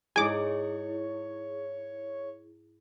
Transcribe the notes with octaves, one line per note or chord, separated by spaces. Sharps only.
G#2 G#3 E4 G#4 C#5 G#5 D6